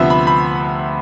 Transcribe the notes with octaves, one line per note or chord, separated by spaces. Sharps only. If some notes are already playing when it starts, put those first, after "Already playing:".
Already playing: D2 C3 F3 B3 E5
B5
B5